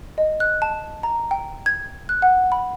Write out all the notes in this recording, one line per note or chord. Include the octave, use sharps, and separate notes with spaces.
D#5
F#6
A5
A#5
G5
G#6
F#6
F#5
B5